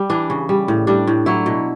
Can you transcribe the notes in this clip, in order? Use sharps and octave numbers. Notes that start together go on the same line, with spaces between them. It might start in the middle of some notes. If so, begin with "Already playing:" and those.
Already playing: G3
E3 D4
C#3
G3
A2
G3 D4
A2
F#3 E4
B2